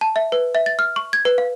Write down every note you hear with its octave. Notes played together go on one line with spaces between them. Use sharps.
A5
E5
B4
E5
A6
F6
C#6
G#6
B4
F5